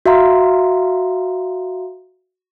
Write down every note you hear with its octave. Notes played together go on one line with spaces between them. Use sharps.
F#4 E5 F5 A#5 C6